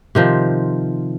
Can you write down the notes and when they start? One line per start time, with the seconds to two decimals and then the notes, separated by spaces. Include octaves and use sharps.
0.15 C3 D#3 F3